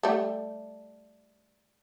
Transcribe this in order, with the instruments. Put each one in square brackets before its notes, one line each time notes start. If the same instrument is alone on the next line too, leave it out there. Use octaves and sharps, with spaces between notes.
[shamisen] G3 A3